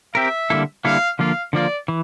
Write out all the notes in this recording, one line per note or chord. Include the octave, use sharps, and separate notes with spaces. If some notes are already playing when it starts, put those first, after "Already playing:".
C4 G4 A#4 E5
D3 G3 A#3 E4 A4
D3 G3 A#3 E4 A4 F5
D3 F3 A#3 F4 F5
D3 F3 A#3 F4 D5
E3